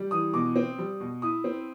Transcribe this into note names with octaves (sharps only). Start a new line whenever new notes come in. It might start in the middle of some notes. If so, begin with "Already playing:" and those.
Already playing: G3
E3 D#6
B2 D6
C4
G3
B2
E4 D#6
C4